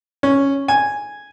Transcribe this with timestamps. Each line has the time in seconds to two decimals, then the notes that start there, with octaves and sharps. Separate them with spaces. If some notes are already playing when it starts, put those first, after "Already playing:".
0.23 C#4
0.68 G#5